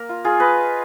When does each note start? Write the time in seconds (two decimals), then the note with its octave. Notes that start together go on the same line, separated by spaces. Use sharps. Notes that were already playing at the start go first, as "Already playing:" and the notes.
Already playing: A#3 A#4
0.09 F4
0.24 F4 G#4
0.40 F4 B4 D#5